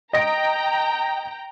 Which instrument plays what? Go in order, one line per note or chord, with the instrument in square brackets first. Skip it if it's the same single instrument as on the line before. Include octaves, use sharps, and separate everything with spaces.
[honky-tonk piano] D#5 A#6 D7 [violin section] G5 A#5